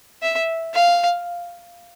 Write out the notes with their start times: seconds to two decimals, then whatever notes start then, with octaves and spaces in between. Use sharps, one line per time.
0.22 E5
0.74 F5